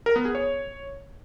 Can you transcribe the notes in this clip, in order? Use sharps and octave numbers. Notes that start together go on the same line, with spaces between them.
A#4
B3
G#4
C#5